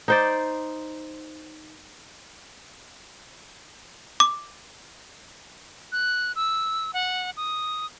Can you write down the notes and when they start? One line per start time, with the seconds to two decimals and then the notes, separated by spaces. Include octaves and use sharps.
0.08 D#4 C5 D5
4.20 D6
5.92 F#6
6.35 E6
6.93 F#5
7.37 D#6